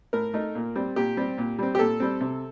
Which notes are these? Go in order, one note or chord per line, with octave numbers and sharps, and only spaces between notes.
A2 A#4
A3 D#4
A#2
G3 C4
A#2 G4
G3 C4
A#2
G3 C4
G4
A#2 A4
G3 C4
C3